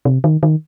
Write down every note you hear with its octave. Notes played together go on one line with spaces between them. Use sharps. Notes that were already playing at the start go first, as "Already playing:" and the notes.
C3
D#3
D#3